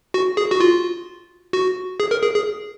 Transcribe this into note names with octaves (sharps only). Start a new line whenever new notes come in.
F#4
G#4
F#4
F4
F#4
G#4
A#4
G#4
G#4